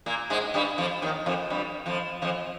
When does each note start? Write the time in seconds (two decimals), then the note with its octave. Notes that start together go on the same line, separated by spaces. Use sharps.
0.06 A#2 A#3
0.30 G#2 G#3
0.54 G2 G3
0.78 F2 F3
1.02 D#2 D#3
1.26 F2 F3
1.50 G2 G3
1.86 F2 F3
2.22 F2 F3